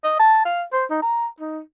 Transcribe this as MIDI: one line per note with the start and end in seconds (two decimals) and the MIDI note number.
0.04 0.15 75
0.20 0.42 81
0.45 0.63 77
0.73 0.85 72
0.90 1.02 63
1.02 1.27 82
1.40 1.60 63